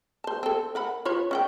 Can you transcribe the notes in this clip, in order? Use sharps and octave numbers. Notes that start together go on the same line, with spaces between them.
C5 A5
C4 A4
A#4 F#5 B5
F4 B4 C#5
C#4 F#5 G5